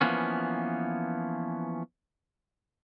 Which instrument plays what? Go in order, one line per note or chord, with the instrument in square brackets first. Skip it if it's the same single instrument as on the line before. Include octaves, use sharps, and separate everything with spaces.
[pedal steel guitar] E3 F3 A#3 B3 C#4